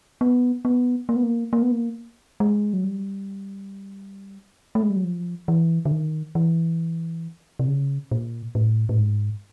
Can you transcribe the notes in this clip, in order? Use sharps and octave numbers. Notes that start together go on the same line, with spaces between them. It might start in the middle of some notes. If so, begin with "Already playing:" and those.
B3
B3
A#3
B3
A#3
A#3
B3
A#3
G#3
F#3
G3
A3
G#3
G3
F#3
F3
E3
D3
D#3
E3
C3
C#3
A#2
A2
A2
G#2